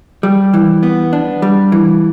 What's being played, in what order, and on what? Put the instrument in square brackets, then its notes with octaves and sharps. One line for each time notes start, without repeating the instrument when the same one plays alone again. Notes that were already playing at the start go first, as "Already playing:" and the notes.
[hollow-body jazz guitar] G3
E3
B3
D4
G3
E3